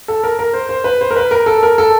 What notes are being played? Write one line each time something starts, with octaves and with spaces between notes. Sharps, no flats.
A4
A#4
A#4
C5
C5
B4
C5
A#4
B4
A#4
A4
A#4
A4